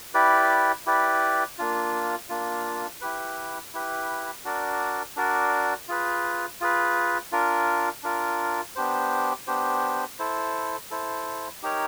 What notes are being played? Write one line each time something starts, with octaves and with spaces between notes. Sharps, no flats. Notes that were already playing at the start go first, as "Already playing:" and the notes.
E4 G4 B4 D5
E4 G4 B4 D5
A#3 D4 F4
A#3 D4 F4
E4 G4 B4
E4 G4 B4
D4 F#4 A#4 D5
D4 F#4 A#4 D5
F4 G#4 B4
F4 G#4 B4
D4 F4 A#4
D4 F4 A#4
B3 D4 G4 C5
B3 D4 G4 C5
E4 A4 C5
E4 A4 C5
D#4 G4 A#4 C#5